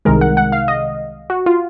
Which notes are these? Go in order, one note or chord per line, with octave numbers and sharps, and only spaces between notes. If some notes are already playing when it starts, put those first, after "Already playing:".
C2 C3 D#3 G#3 A#4
F#5
F#5
F5
D#5
F#4
F4